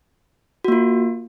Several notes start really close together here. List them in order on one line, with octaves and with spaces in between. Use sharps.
F#4 A#3 F4